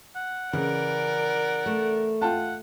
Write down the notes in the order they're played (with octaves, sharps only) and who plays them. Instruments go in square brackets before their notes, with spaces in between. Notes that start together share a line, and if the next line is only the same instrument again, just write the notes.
[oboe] F#5
[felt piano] C#3 [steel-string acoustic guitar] E3 [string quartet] A#4 D5
[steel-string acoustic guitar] A3
[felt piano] F4 G5 A5 [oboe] F#5